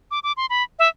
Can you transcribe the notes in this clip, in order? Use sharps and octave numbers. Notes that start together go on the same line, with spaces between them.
D6
D6
C6
B5
E5